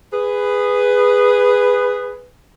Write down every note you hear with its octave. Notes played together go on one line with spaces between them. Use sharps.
G#4 B4